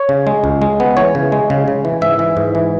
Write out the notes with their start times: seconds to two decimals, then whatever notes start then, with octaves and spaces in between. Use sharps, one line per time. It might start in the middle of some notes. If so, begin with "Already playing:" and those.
Already playing: C#5
0.09 C#3
0.27 G#3
0.44 C#2
0.62 G#3
0.80 B3
0.97 E3 C#5
1.15 C#3
1.32 G#3
1.50 C#3
1.68 C#3
1.85 E3
2.02 G#2 E5
2.19 E3
2.37 G#2
2.55 E3